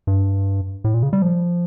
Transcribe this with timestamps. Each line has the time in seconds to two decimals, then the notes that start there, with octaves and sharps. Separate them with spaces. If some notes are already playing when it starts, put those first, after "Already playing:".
0.07 G2
0.84 A2
0.94 A#2
1.03 C#3
1.13 G3
1.22 F3